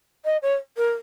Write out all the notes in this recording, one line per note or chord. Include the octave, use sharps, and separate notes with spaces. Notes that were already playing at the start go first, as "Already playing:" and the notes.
D#5
C#5
A#4